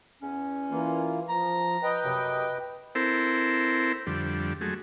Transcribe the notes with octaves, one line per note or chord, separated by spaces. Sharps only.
E2 C#4
E3 A#3 F4
F3 A#5
B4 D#5 G5
F#2 C3
C4 E4 A4 A#4 C5
F2 D3 G3
F#3 G#3 A3